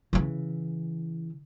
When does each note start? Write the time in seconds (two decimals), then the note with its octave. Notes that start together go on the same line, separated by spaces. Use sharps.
0.13 C#3 E3